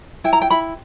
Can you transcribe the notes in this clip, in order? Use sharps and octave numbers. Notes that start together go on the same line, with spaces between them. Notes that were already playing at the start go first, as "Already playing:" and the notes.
E4 G5
A#5
G5
E4 B5